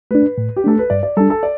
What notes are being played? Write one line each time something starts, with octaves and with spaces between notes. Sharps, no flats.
A3 D4 B4
A2
G4
A3 D4 A4
B4
G2 D5
D5
G3 D4 A4
A4
D5